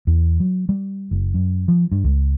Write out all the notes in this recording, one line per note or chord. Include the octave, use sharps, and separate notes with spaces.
E2
F#3
G3
F#1
F#2
F3
G2
C#2